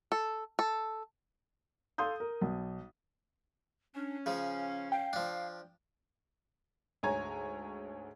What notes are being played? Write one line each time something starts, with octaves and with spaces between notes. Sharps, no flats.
A4
A4
A4 F5 C6 D#6 G6
A#4
B1
C#4 D4
C#3 F3 F5
F5 G5
F3 D4
D2 G#2 C#5 G#5 A#5 G#6